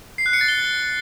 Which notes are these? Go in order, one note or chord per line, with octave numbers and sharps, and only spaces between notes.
C7
F#6
C#7
A6
G7